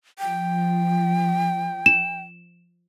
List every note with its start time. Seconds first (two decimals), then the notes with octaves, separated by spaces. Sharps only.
0.19 F3 G5
1.86 E7